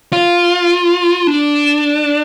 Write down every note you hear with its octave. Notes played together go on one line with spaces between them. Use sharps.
F4
D4